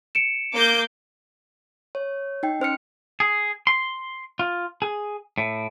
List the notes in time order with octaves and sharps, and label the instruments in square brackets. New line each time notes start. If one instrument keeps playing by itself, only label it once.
[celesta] C#7 D7 E7
[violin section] A#3 D6 G6
[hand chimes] C#5
D#4 G5
C#4 C5 F6 C#7
[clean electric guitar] G#4
C6
F4
G#4
A2